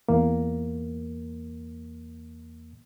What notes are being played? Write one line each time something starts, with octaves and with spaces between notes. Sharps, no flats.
E2 A#3